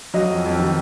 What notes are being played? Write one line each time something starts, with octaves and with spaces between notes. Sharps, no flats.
F#3 D#5
F2
F2
D#3